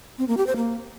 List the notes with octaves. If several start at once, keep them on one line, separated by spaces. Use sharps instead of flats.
C4
A#3
G4
C5
A#3